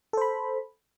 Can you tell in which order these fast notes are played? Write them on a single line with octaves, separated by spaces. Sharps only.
A4 C5 B5